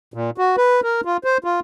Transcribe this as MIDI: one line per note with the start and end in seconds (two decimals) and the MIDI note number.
0.14 0.30 46
0.38 0.56 66
0.57 0.81 71
0.83 1.01 70
1.05 1.17 65
1.24 1.38 72
1.44 1.60 65